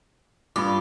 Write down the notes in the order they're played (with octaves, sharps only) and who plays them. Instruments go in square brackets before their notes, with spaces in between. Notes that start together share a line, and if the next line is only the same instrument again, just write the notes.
[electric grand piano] G2 [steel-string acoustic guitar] F4 [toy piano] B5 D6